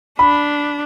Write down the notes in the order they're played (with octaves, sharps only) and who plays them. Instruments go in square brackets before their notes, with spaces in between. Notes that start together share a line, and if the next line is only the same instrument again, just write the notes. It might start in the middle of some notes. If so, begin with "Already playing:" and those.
[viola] D4 [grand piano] B5